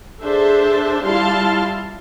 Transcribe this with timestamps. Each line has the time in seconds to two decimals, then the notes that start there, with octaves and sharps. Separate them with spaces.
0.22 D4 G#4 A4 C5 E5 A5
1.04 G3 E4 F4 F5 A5 C6